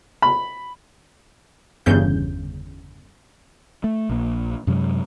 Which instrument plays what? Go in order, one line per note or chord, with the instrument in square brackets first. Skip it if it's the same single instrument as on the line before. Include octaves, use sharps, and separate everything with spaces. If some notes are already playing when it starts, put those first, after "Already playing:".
[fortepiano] B5
[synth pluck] G1 E2 G2 C#3 G6
[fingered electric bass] A3
A#1 A#3
F#2 C3 F#3 G#3